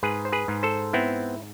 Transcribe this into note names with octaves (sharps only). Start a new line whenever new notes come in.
G#2 G#4 B4
C5
G#4 B4
G#2
A4 C5
B3 C4 E4